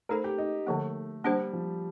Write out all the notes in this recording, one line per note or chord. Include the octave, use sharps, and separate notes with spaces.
A3 D#4 A4 A#4 C5
G4
D#4
D3 F3 A3 A#3
G3 A#3 D4 G4 C5
F3